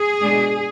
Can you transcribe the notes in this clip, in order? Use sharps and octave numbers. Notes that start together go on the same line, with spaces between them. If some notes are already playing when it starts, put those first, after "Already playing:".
Already playing: G#4
B2 G#3 D4